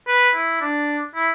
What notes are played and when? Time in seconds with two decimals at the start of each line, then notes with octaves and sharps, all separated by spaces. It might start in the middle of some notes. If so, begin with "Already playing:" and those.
0.07 B4
0.35 E4
0.61 D4
1.16 E4